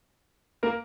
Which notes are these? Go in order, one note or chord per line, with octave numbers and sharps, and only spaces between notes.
A#3 A#4